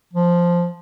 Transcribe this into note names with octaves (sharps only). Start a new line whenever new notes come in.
F3